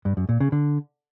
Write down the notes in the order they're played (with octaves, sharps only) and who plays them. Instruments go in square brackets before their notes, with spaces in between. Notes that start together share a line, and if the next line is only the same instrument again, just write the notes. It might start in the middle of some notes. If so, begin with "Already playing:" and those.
[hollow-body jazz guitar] G2
F#2
A#2
C#3
D3